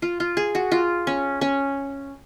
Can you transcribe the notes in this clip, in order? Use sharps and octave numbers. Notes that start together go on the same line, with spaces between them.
F4
F4
G#4
F#4
F4
C#4
C#4